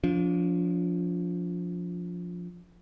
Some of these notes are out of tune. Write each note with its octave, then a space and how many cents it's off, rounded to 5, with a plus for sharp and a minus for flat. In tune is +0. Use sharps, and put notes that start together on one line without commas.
F3 +10 D4 -35